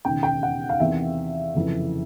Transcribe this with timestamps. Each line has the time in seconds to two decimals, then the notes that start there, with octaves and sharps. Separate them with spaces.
0.05 E1 D#2 C#3 G5
0.23 G5
0.43 F#5
0.69 F5
0.80 E2 C3 D#3 E5
1.55 F#1 F2 C3 E3